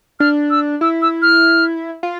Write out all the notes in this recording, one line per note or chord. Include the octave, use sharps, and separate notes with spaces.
D4 F6
E6
E4 E6
E6
F6
F4